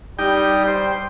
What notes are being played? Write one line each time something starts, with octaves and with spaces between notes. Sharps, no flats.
G3 D#4 G4 G5
C5 G5